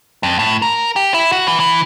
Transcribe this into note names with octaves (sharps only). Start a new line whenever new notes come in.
F2
A2
A#4
G4
E4
F#4
E3
E3